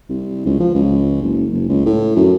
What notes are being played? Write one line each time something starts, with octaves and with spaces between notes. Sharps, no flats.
C2
C#2
F3
C#2
F#1
F#1
C#2
A2
F#2